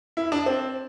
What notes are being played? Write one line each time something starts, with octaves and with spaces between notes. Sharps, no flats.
E4
D4
C4